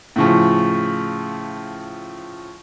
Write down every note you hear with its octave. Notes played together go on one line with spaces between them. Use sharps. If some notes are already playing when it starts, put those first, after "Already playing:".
A2 C#3 F3